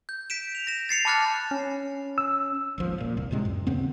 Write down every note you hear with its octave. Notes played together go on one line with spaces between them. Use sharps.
G6
G6 B6 D7 E7
F7
A#6 E7
A6 C7 C#7 F7
A5 B5 D6 F6 F#6 A6
C#4
E6
G#1 D#2 F3
D#1 A#2
F1 C2
C#2 A2 C3 G#3
F#2
D#2 C#3 B3 C4